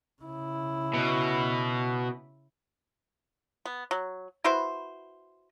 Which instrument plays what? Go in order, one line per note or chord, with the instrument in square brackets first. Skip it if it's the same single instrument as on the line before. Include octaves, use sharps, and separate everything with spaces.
[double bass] C#3 E4
[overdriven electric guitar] B2
[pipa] B3
F#3
E4 F#4 B4 C5